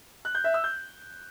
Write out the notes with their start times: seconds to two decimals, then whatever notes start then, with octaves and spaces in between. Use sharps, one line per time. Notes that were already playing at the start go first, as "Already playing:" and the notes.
0.25 F#6
0.35 G6
0.44 E5
0.54 E6
0.64 G6